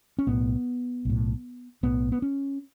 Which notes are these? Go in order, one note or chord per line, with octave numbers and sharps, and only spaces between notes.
C#4
B1 A2 B3
B1 A2
B1 A2 B3
B3
C#4